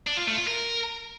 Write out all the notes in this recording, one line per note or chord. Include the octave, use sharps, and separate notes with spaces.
D4
F4
A3
F4
A#4